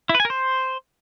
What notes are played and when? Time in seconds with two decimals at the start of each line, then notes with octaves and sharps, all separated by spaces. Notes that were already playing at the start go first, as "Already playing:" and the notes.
0.09 E4
0.15 B4
0.20 G#5
0.25 A#4
0.30 C5